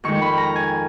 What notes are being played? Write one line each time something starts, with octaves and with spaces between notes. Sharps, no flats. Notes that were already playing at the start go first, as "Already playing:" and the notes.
F2 D#3 G#3 C#6
B5
A#5
G#5